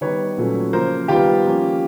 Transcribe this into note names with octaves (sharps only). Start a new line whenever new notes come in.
D#3 G3 B3 D#4 B4 C#5
A#2 F#3 A3 C#4
C#3 F3 A#3 A#4 C5
D#3 G3 B3 F4 G4
F3 A#3 C#4